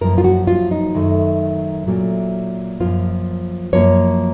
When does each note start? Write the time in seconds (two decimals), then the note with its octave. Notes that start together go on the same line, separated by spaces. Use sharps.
0.01 F#2 F3 A#3 A#4
0.18 F4
0.24 F#4
0.47 F4
0.71 D#4
0.94 F#2 D#3 A3
1.87 A#2 F#3 A3
2.80 F#2 F3 A#3 F4
3.73 F#2 F3 A#3 C#5